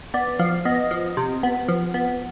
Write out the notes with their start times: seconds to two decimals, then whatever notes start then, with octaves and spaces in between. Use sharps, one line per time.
0.14 B3 D5
0.39 F3 F5
0.65 B3 D#5
0.91 F3
1.17 C3
1.43 B3
1.69 F3
1.94 B3